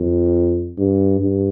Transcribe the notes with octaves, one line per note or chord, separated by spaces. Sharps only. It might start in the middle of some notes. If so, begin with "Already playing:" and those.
Already playing: F2
G2
G2